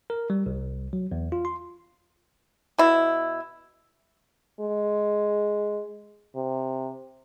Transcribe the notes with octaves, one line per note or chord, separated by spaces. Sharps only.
A#4
G3
C2
F#3
E2
F4
C6
B2 E4
G#3
C3